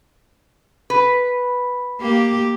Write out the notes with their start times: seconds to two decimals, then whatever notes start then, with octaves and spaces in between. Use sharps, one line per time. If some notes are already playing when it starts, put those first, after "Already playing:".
0.90 B4
2.00 A#3 G4